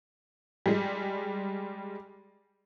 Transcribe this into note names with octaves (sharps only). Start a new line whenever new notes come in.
G3 G#3